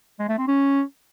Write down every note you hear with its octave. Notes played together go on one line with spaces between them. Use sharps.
G#3
A3
C4
C#4